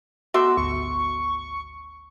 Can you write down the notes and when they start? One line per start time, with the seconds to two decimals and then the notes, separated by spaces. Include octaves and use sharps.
0.34 A3 B3 F#4 E5 C6 D6
0.57 G#1 D2 C#6